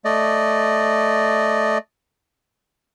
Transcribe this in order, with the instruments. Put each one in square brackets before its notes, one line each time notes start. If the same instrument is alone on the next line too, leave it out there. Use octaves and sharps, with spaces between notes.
[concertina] A3 D5 D#5